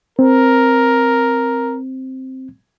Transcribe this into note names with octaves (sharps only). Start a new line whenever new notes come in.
C4 A#4